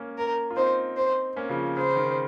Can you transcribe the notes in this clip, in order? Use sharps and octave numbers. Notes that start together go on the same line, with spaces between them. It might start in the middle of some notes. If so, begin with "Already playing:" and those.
Already playing: A#3 C#4
A#4
F4
C4 D#4 C5
C5
A#3 C#4
C#3 F3
C#3 C5
D#3